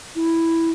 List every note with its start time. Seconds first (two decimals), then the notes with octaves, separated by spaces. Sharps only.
0.16 E4